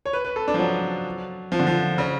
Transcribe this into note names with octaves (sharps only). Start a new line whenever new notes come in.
C#5
B4
B4
A4
D4
F3
F#3
F3
D3
F3
C#3